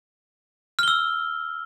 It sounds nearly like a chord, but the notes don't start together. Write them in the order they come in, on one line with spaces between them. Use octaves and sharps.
F6 G7 E6